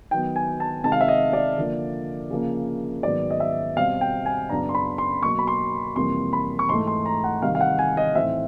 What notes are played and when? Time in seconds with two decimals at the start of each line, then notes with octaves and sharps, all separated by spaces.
0.11 D#3 F#3 B3 G5
0.36 G#5
0.60 A5
0.84 C3 D#3 G#3 A5
0.92 F5
1.01 E5
1.08 D#5
1.33 D5
1.57 D3 F3 A#3
2.30 C#3 F3 A#3
3.03 G#2 D#3 F#3 B3 D5
3.30 D#5
3.40 E5
3.77 B2 G3 C4 F5
4.01 G5
4.26 G#5
4.49 F#2 C#3 F#3 B3 D4 A#5
4.69 C6
4.75 B5
4.98 C6
5.23 B2 F#3 A#3 C#6
5.39 B5
5.47 C6
5.96 F2 C3 E3 G3 A#3 C6
6.33 B5
6.59 C#6
6.69 G#2 E3 A3 C6
6.87 C6
7.06 A#5
7.24 F#5
7.42 C3 D#3 G3 F5
7.55 F5
7.61 F#5
7.79 G#5
7.97 D#5
8.15 A2 E3 A3 C4 D#4 E5